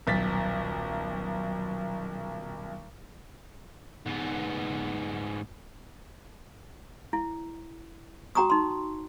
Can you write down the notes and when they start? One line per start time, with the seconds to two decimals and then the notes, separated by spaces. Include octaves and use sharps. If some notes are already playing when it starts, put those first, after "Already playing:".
0.07 D#1 B1 A6 B6
4.06 G#2 B3
7.13 E4
8.35 F#4 G5 A#5 C#6 D#6
8.50 D#4 C6